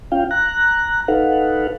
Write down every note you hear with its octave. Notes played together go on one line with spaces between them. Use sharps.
C#4 F4 F5 G5
A#5 F#6
D#4 A4 B4 F5 F#5